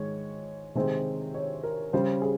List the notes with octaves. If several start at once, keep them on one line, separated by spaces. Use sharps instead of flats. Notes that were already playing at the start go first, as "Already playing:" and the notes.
Already playing: G#2 D#3 G#3 C#5
C3 D#3 G#3 C4
C#5
A#4
C#3 G3 C#4 C5
G#4